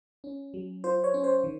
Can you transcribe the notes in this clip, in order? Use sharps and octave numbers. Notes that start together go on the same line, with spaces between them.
C#4
F#3
F4 C5
C#5
C#4
C5
D#3